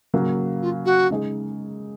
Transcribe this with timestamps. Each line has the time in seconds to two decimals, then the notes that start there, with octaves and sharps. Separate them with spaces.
0.14 C#3 F#3 A#3
0.62 F4
0.85 F#4
1.10 C#3 G#3 D#4 G#4